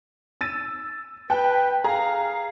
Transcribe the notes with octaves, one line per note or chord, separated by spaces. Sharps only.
E6 A6 D#7
B4 G5 A5 F#6
G#4 F5 A#5